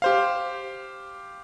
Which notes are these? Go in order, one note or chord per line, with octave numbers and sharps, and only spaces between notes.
G4 C5 F5